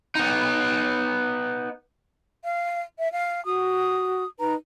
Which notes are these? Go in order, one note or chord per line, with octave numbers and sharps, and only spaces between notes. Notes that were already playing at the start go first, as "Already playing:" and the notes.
B3 D#4
F5
E5
F5
F#4 D#6
D#4 B4 A#5